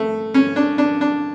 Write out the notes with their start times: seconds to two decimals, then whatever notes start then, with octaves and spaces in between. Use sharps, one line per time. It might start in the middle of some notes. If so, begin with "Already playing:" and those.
Already playing: A3
0.34 C#4
0.56 D4
0.78 D4
1.01 D4